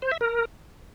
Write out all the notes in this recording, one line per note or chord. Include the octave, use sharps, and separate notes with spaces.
C5
E5
A#4